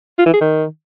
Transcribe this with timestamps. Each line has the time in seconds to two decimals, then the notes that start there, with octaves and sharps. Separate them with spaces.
0.19 F4
0.26 E3
0.34 G#4
0.41 D#3